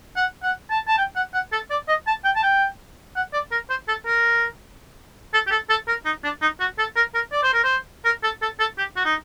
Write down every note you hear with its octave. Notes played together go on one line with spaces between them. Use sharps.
F#5
F#5
A5
A5
G5
F#5
F#5
A4
D5
D#5
A5
G5
A5
G5
F#5
D5
A#4
C5
A4
A#4
A4
G4
A4
A4
A#4
D#4
D4
D#4
F#4
A4
A#4
A#4
D5
C5
A#4
C5
A#4
A4
A4
A4
G4
F#4
D#4